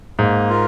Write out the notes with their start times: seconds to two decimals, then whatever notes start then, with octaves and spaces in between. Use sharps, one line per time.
0.19 G#2 A#3
0.49 F4 A#4